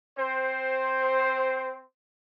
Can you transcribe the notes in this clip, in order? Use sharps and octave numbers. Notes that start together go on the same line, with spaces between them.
C4 C5